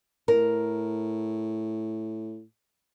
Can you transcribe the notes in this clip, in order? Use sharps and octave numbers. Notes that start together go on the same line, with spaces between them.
A2 A#4